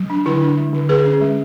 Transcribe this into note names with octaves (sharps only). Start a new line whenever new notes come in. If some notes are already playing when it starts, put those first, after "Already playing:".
Already playing: F#3
D4
D3 E4
D4
G#3
D3
D3 G#4 B4
C#4
G#3